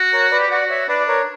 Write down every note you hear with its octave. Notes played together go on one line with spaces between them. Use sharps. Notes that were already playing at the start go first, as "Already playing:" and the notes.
Already playing: F#4
A#4 C#5
B4 D5
G4
F#4 D5 F#5
C#5 E5
D4 B4 D5
A#4 C#5